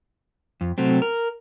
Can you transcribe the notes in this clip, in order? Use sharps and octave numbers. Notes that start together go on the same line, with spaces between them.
F2
C3 F#3 A3 C4
A#4